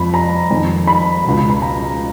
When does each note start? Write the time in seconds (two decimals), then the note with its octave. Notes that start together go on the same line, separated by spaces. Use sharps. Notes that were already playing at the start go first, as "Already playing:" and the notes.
Already playing: F2 F3 B5
0.14 A#5
0.50 F2 D#3
0.87 B5
1.25 C#2 B2
1.50 B5
1.62 A#5